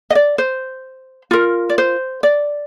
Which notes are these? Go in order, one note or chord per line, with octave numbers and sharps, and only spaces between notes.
D#5
D5
C5
F4 A#4
D5
C5
D5